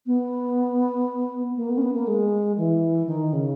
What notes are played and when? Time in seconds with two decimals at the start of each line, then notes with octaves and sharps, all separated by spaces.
0.06 B3
1.56 A#3
1.69 B3
1.77 C#4
1.81 B3
1.95 A#3
2.07 G#3
2.58 E3
3.07 D#3
3.33 C#3